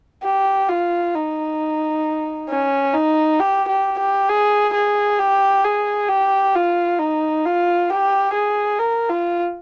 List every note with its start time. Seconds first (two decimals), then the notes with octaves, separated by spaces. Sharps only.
0.24 G4
0.69 F4
1.15 D#4
2.49 C#4
2.94 D#4
3.40 G4
3.69 G4
3.99 G4
4.29 G#4
4.74 G#4
5.19 G4
5.64 G#4
6.09 G4
6.55 F4
6.99 D#4
7.45 F4
7.90 G4
8.34 G#4
8.79 A#4
9.09 F4